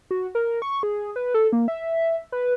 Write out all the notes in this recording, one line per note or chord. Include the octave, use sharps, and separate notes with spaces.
F#4
A#4
C#6
G#4
B4
A4
A#3
E5
B4